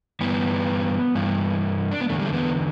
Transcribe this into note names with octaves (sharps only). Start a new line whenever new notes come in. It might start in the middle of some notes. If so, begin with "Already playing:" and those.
G2 E3 B3
G2 E3
D4
B3
E2 D3 A3
G3
A3
B3